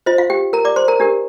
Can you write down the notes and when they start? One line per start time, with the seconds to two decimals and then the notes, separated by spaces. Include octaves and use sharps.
0.06 F4 C5 D#5
0.18 F4 F5
0.30 G4 G5
0.53 A#4 A#5
0.65 D5 D6
0.76 C5 C6
0.88 A#4 A#5
1.00 D4 G4 A#4